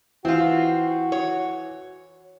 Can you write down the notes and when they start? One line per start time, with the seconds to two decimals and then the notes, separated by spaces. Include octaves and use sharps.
0.25 E3 C4 F4 F#4
1.12 C#5